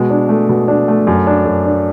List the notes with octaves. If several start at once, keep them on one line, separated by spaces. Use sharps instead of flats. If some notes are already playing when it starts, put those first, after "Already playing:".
Already playing: B2 G#3
D4
A3
B2
D4
A3
F#2
D4
F#2
D4